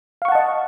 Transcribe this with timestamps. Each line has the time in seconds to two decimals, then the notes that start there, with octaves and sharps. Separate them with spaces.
0.22 F5
0.25 C#6
0.28 F#5
0.32 A5
0.35 D#5